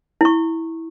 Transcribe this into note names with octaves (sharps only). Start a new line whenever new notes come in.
E4 C#6